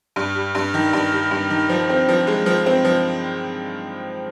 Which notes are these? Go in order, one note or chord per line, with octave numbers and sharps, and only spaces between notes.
G2
G3
G2
D#3
G2
G3
G2
D#3
F3
C4
F3
G#3
F3
C4
F3